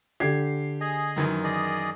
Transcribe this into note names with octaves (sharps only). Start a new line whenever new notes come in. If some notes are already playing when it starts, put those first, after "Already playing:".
D3 G4 G#6 C7
G#4 D#5 G#5
F#2 D#3 E3
G#4 D5 D#5